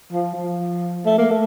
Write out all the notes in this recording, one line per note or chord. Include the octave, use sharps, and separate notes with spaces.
F3
F3
A3
A#3
A3